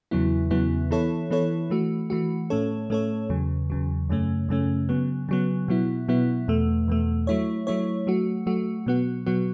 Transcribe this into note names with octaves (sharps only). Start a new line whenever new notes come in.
E2 C#3 F#3 B3 E4
E2 C#3 F#3 B3 E4
E3 B3 E4 A4 C#5
E3 B3 E4 A4 C#5
E3 A3 F#4
E3 A3 F#4
A2 A3 C#4 A4 C#5
A2 A3 C#4 A4 C#5
E2 C#3 F#3
E2 C#3 F#3
F#2 C#3 A3 C#4
F#2 C#3 A3 C#4
C#3 F#3 B3
C#3 F#3 B3
B2 F#3 B3 E4
B2 F#3 B3 E4
E2 B2 A3
E2 B2 A3
F#3 A3 E4 C#5
F#3 A3 E4 C#5
F#3 A3 F#4
F#3 A3 F#4
B2 F#3 B3 F#4
B2 F#3 B3 F#4